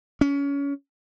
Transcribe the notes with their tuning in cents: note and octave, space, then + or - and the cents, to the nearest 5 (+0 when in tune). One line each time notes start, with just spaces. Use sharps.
C#4 +25